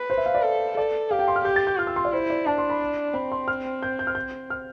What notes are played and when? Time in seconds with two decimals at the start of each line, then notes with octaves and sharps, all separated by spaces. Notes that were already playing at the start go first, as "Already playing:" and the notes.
Already playing: B4
0.10 C5
0.18 E5
0.26 F5
0.35 D5
0.43 A4
0.77 A4 D5
1.11 G4 F5
1.19 G5
1.28 C6
1.36 F6
1.45 G4 G6
1.56 A6
1.67 G6
1.79 F4 F6
1.87 E6
1.96 C6
2.05 D5
2.12 E4 C5
2.30 D5
2.47 D4 A5
2.58 C6
2.69 B5
3.14 C4 B5
3.32 C6
3.48 F6
3.83 G6
3.99 G6
4.07 F6
4.15 G6
4.50 F6